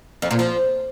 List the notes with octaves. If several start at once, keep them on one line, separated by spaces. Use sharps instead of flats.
F2
A#2
F3